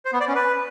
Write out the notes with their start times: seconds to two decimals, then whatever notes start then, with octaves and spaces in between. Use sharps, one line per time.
0.05 C5
0.13 B3
0.20 D5
0.28 C#4
0.35 B4